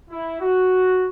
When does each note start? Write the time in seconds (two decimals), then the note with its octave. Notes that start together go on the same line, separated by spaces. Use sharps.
0.10 E4
0.41 F#4